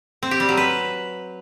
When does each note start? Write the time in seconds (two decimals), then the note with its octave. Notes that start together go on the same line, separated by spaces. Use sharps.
0.23 C4
0.31 G4
0.40 G3
0.49 F#3
0.57 B4